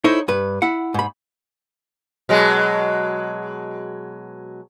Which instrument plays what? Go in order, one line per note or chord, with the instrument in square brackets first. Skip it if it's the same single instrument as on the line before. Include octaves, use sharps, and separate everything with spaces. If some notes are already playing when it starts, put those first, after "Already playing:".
[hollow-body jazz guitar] D#4 E4 A4 C5 C#5
G2 B4
E4 F#5
G#2 B5
[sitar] B2 F#3 G#3